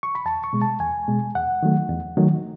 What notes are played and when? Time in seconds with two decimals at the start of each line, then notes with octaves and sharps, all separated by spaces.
0.03 C#6
0.15 B5
0.25 E2 A5
0.44 C#6
0.53 B2 G#3
0.62 A5
0.80 E2 G#5
1.08 B2 G#3
1.35 E2 F#5
1.63 D#3 F#3 A3
1.89 E2
2.17 D#3 F#3 A3